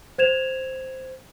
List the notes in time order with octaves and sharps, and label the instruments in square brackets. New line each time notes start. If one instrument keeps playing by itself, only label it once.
[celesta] C5 G#6 E7 F7